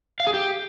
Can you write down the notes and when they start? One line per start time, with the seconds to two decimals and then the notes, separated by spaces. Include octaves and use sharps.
0.20 F5
0.27 G#4
0.34 G4